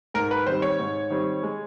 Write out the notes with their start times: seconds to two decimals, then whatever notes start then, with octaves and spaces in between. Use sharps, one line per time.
0.14 G#2 A#4
0.31 B4
0.47 D#3 G3 C4 C5
0.62 C#5
0.79 G#2
1.10 D#3 G3 C4
1.43 G#3